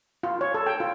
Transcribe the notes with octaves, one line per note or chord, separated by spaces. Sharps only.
F4
C#5
A4
G5
F4